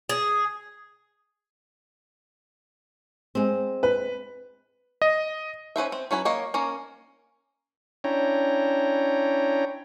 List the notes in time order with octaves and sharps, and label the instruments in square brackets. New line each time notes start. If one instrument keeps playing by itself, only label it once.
[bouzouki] G#4
[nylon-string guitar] G#3 C4
[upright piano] B4
[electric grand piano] D#5
[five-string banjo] C#4 B4 C5 E5
C4
F#3 C#4 E4 B4
A#3 A#4 C#5 D#5
A#3 C#4 A#5
[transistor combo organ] C#4 D4 E4 C#5 G5 A#5